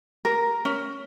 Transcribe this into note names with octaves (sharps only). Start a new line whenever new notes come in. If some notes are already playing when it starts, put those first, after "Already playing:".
A#4
C#4